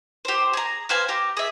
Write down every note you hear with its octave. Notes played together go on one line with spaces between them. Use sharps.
G4 C5
G#4 A#5
B4 C5 F5 G#5
G4 A#5
G#4 E5